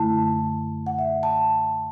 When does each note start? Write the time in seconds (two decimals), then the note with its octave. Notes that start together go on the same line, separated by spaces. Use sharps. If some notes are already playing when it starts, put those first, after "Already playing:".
Already playing: F#2 D3 A3 E4 A5
0.87 F#5
0.99 E5
1.23 A5